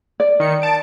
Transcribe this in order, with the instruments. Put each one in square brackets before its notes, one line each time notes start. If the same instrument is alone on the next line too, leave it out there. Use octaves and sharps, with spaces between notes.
[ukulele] D5
[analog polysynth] D#3 C#7
A5 D7